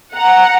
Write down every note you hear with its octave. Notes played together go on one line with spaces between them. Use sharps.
F#5 A#5